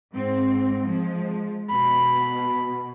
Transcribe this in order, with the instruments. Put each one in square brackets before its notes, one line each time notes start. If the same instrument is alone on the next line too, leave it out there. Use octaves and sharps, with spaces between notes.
[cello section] G#2 C4
F3 G#3
[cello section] B2 [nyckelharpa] B5